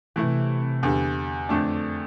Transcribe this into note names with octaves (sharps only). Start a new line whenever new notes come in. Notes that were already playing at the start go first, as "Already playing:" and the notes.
C3 E3 A3 E4
E2 D3 G3
F2 D3 A3 D4